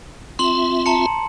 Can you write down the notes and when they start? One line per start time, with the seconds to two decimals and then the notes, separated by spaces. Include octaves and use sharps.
0.39 C4 F4 E5 C6 F#7
0.86 A5 A#5 C#7